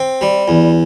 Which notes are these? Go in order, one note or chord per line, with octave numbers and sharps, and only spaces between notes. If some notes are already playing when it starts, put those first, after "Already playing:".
Already playing: C4
G3
E2